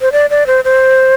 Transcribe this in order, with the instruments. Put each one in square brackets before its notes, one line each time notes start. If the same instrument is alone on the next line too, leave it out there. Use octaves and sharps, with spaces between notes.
[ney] C5
D5
D5
C5
C5